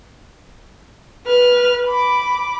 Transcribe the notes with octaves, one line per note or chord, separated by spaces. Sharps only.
B4 F6
B5 D6